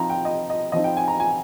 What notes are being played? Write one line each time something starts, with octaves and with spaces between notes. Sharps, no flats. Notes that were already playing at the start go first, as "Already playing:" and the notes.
Already playing: F3 C4 D#4 A#5
G5
D#5
D#5
F3 C4 D#4 D#5
G5
G#5
A#5
G#5